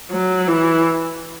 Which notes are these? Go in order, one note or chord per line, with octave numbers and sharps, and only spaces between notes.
F#3
E3